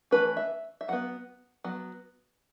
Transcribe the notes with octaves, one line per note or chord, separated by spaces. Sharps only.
E3 A3 C#4 B4
E5
E5
F#3 B3 F#5
F#3 B3